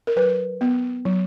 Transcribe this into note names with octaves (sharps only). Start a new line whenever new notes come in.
A#4
F#3 B4
B3
F#3